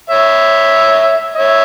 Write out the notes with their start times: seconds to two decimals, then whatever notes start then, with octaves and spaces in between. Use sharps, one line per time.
0.10 C#5 E5
1.36 C#5 E5